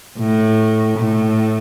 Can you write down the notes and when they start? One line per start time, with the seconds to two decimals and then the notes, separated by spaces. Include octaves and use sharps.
0.19 A2
0.98 A2